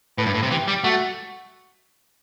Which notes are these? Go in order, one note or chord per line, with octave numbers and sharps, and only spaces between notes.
A2 B4
G2
A2
C3
E3 G4
G3
A3 F#4